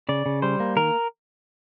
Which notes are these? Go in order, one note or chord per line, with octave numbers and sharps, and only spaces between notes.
C#3 D5
C#3
G3 C5
A#3
D#3 A#4